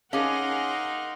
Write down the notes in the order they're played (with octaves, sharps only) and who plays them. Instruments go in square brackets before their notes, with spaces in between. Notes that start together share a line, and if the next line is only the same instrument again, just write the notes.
[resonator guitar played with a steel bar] C#4 G#4 [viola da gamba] D#4 A#4 [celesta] F5 D6 [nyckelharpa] F#5 C6